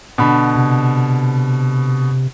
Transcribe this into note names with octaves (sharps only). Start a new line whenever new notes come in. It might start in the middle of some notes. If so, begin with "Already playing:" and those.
B2 D3 B5
C3